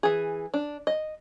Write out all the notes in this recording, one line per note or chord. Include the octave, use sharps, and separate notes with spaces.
E3 G#4
D4
D#5